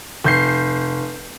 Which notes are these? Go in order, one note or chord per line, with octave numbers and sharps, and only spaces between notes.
F1 G6 C7